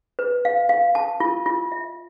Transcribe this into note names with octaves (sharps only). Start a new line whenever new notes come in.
B4
F5
F5
A5
F4
F4
E5